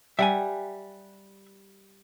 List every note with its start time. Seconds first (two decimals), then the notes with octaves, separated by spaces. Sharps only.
0.19 G3 E5 F#5 G#5